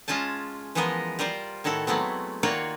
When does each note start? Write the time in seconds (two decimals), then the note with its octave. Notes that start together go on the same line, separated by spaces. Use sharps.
0.08 G#3 C#4 F4 G#5 A5
0.75 E3 F3 G#3 B3 A#4 D#5
1.19 G3 F4 A#4 C5 D5
1.64 A2 D#3 E4 F#4 A4
1.87 F#3 G#3 A3 B3 C4
2.43 D#3 A#3 F4 F#4 C#5 D5